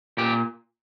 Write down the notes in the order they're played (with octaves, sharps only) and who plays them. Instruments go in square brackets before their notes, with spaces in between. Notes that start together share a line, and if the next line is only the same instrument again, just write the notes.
[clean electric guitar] A#2 G4